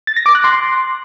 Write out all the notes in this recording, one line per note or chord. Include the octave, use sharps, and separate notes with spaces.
A6
A#6
D6
F#6
C6